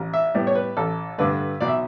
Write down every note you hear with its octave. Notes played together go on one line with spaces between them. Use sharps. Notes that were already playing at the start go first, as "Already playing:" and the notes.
Already playing: A1
E5
A2 G3 B3
C#5
B4
A1 A4
G2 D3 A3 B4
B1 D5
E5